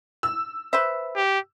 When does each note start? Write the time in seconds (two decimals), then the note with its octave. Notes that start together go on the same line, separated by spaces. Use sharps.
0.23 E6
0.73 B4 C5 E5
1.16 G4